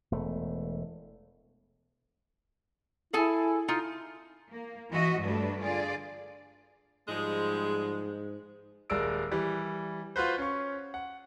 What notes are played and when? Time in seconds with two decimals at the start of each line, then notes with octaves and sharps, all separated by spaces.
0.12 E1 A3
3.13 E4 G#4 A4 G#5
3.68 D#4 F4
4.50 A#3
4.91 E3 F3 F#4 D#5 E5
5.20 G2 F#3 A3 D4 B4
5.61 D3 F4 G#4 D5
7.08 G#2 F3 G3 G#3
8.90 D#1 G#3 A#4 D5 E6 D7
9.31 E3 G3
10.16 F4 F#4 B4 C5
10.38 C#4 C#6
10.94 F#5